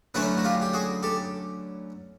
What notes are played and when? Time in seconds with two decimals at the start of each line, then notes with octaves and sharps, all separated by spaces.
0.14 D3 F#3 A3 C#4 E4 B4 C#5
0.38 F#4
0.44 F4 G4
0.62 G4
0.73 F#4 G#4
1.03 G4 A4